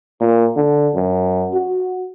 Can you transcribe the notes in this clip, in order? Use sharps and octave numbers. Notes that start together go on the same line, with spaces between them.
A#2
D3
F#2
F#4